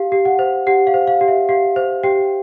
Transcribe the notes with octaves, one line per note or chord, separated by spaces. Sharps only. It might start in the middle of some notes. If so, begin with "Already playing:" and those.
Already playing: G4 F5
G4
F#5
C5
G4 F#5
F5
C5
F5
G4
E5
G4 F5
C5
G4 G5